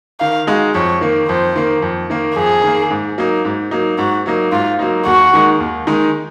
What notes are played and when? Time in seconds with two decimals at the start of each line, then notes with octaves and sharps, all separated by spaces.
0.20 D#3 F5
0.47 G#3 D#4 F#4
0.75 F2 C#5
1.01 D#3 A#3
1.28 F2 C5
1.56 D#3 A#3
1.82 F2
2.10 D#3 A#3
2.36 F2 G#4
2.64 D#3 A#3
2.90 G#2
3.18 F#3 A#3 D#4
3.45 G#2
3.71 F#3 A#3 D#4
3.98 G#2 F#4
4.26 F#3 A#3 D#4
4.52 G#2 F4
4.79 F#3 A#3 D#4
5.06 D#2 F#4
5.33 D#3 G#3 D#4
5.60 D#2
5.87 D#3 G#3 D#4